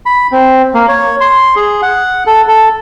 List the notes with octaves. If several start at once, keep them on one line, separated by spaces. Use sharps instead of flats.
B5
C4
A#3
C#5
C6
G#4
F#5
A4
A4